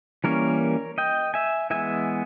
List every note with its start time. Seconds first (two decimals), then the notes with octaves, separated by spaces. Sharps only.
0.24 E3 G3 A#3 C#4 A#4 C#5
0.98 D#5 G5
1.34 E5 G#5
1.70 E3 G#3 B3 E5 G#5